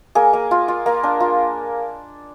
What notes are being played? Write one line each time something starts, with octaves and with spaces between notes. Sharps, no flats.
A#3 G#4
A#3
F4
F4
A#3
D4
F4